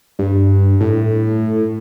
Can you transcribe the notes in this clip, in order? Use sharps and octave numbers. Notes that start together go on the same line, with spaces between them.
G2
A2